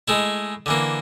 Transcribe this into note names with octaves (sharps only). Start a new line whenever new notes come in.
G#3 A3 E4
D3 E3 A#3